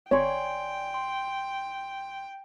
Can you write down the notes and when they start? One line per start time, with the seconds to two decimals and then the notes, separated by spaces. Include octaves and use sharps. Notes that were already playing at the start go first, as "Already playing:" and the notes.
0.11 G#1 C#5 D5 G5 G#5 C6
0.94 C6